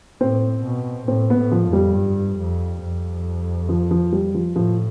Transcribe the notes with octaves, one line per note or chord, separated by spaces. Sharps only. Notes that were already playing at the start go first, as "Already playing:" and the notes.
A2 C4
B2
A2 C4
B3
A2
F3
F2
G3
G2
F2
F2
F3
F3
G3
F3
A2 F3